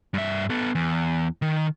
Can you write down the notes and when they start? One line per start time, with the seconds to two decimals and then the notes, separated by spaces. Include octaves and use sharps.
0.14 G2 E5
0.50 B3 A4
0.75 E2
1.42 D#3